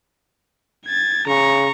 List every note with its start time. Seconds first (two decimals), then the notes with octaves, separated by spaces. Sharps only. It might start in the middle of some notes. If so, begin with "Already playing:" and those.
0.86 G#6 A6
1.27 C#3 A#5 C#6